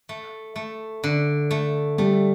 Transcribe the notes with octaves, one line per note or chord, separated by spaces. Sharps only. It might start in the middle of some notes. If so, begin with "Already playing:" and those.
A3
A3
D3
A3
G3 A3 G4